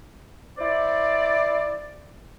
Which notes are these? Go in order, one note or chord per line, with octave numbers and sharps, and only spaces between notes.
E4 C5 D5